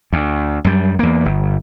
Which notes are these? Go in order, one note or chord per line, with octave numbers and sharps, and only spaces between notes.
D2
F#2 G3
E2 A#3
G1